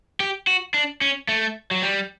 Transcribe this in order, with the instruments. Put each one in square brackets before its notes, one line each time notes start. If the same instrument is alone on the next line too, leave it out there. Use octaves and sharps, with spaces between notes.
[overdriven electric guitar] G4
F#4
D4
C#4
A3
F#3
G3